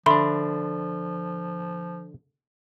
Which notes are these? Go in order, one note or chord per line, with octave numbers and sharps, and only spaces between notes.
D3 F3 D4 E5 B5 C6